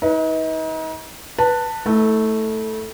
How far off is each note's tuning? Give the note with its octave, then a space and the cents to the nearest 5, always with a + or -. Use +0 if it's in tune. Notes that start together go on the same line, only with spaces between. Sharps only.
D#4 +35 B4 -15
B4 -10 A5 +20
A3 +0 E4 -35